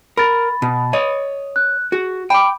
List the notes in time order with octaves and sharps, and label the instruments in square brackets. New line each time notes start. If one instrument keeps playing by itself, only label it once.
[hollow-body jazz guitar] A#4 [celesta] B5 A6
[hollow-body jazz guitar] B2
C#5 D#5
[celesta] F#6
[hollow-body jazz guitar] F#4 [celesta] G#4
[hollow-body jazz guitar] G5 [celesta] B5 D6